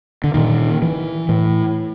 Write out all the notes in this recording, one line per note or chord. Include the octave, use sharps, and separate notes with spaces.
D3
A#2 D#3
E3
A2